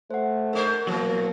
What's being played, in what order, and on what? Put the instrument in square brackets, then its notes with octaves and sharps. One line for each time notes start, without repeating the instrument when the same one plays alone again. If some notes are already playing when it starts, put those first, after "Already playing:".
[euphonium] A3 [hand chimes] C5 F#5
[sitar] G#2 G#3 C5 [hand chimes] A#4
[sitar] A#2 E3 [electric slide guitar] F#3 [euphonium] A#3